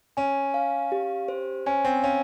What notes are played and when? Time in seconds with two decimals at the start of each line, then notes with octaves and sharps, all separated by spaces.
0.17 C#4 G#5
0.54 F5
0.92 G4
1.28 C5
1.66 C#4 G#5
1.85 C4
2.04 C#4 F5